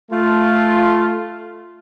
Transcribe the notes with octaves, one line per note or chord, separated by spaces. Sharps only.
A3 F4